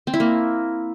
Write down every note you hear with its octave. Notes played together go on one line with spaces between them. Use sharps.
C4
E4
A#3